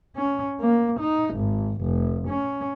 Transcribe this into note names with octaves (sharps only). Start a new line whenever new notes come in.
C#4
A#3
D#4
G#1
F1
C#4